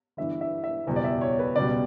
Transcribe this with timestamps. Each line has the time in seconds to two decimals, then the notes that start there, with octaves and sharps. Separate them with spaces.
0.17 G1 G2 E3 E5
0.41 E5
0.64 E5
0.87 F#1 E2 B2 G3
0.96 D5
1.04 E5
1.21 C#5
1.39 B4
1.56 C#2 B2 G3 D5